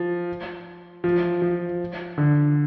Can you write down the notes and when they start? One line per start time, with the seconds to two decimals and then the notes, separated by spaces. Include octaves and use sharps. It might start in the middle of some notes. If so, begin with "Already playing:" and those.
Already playing: F3
1.04 F3
1.42 F3
2.18 D3